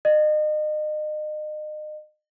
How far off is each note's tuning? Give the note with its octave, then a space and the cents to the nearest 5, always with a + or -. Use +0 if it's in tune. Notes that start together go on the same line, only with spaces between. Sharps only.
D#5 -35